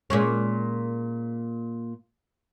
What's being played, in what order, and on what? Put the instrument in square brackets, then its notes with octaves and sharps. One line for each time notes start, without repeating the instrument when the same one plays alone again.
[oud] A#2 G#3 C#4